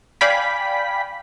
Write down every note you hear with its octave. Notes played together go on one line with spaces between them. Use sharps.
D5 F5 G5 G#5 B5 B6